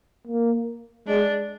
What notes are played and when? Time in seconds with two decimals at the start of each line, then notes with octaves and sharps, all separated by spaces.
0.27 A#3
1.07 G#3 D4